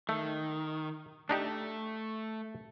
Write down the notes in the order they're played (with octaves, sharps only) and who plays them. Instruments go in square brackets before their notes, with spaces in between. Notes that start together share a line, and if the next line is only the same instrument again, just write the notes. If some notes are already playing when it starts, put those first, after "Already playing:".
[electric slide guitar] D#3 [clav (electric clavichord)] A3
[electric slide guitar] A3 [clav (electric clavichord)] D4 D#4 G4